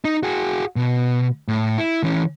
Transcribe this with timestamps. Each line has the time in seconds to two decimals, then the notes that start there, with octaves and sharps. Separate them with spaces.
0.05 D#4
0.23 F#4 G#4
0.76 B2
1.48 A2
1.78 E4
2.03 E3 C#4